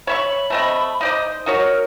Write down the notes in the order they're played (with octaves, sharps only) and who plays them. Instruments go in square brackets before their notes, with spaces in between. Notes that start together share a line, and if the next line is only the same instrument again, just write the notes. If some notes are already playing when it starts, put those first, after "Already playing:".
[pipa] C#5 E5 C#6 [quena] B5
[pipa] A3 C4 D#5
[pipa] D#4 D5 D#5 [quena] C5
[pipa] D#4 F#4 C#5 [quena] A#4